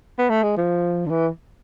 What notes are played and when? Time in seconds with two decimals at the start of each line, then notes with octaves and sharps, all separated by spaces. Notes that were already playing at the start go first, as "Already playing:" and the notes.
0.18 B3
0.30 A3
0.43 G#3
0.57 F3
1.06 D3
1.10 E3